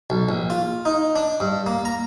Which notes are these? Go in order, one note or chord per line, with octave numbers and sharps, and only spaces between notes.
B1
A#1
F4
D#4
D4
G2
A#3
A#5